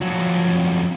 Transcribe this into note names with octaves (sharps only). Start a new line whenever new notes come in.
F2 F#3